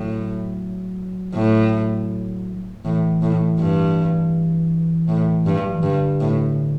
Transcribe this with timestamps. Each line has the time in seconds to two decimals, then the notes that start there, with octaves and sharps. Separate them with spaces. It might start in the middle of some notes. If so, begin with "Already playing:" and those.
Already playing: A2 F#3
1.34 A2
2.85 A2 E3
3.22 A2
3.59 G2
5.08 A2
5.46 G2
5.65 F#3
5.74 E3
5.83 G2 D3
6.21 A2